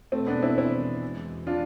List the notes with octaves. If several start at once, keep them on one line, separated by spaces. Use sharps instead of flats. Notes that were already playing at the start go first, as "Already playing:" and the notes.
E2 B2 G#3 A3 C4
B3 D4
C4 E4
C4 E4
D4 F4